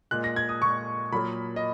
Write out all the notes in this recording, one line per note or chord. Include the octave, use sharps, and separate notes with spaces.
A#2 G#3 F#6
A#6
G#6
D#6
A#2 G#3 C#6
A#2 F#3 A#3 B5
D#5